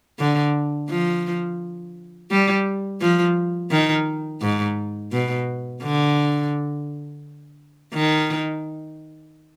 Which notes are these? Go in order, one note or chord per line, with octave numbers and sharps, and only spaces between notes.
D3
F3
G3
F3
D#3
G#2
B2
D3
D#3